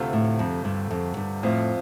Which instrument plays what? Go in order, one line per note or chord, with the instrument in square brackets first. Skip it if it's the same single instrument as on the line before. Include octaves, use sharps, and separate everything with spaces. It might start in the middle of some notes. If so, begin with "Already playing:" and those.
Already playing: [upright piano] D2 C3 A3 F4
[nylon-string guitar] A2
F2
G2
F2
G2
[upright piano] F2 F3 C4 F4 [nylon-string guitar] A2